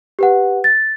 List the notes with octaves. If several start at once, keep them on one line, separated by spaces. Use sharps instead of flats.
G4 B4 F#5
A6